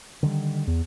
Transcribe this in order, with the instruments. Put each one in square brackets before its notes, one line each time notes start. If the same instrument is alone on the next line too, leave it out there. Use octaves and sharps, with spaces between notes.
[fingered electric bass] D3 D#3 G3
[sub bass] E2